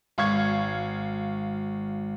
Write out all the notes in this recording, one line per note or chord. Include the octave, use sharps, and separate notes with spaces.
G#1 F5 C#6 G#6